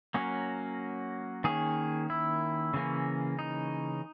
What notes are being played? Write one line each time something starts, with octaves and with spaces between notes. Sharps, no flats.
F#3 A#3 C#4
D#3 A#3 C#4 G#4
E4
C#3 E3 A#3 C#4
D#4